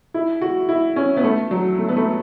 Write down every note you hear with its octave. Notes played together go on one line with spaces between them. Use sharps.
E4
F#4
E4
C#4
B3
A3
F#3
A3
B3
A3